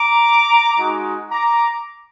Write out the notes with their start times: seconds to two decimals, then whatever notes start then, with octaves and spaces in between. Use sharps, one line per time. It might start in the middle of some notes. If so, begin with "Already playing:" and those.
Already playing: A#5 D6
0.77 G#3 D#4 F#4
1.31 A#5 D6